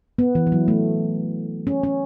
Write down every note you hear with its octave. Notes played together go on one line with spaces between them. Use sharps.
B3
E3
E3
F#3
A3
C#4
C#4